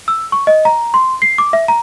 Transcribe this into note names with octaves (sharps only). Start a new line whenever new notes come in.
E6
C#6
D#5
A#5
C6
C7
D6
E5
A#5